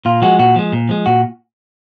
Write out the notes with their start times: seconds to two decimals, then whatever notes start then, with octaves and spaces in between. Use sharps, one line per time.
0.05 A#2 F4
0.22 F3 G#3 F#4
0.39 A#2 F#4
0.56 F3 G#3
0.73 A#2
0.89 F3 G#3
1.06 A#2 F#4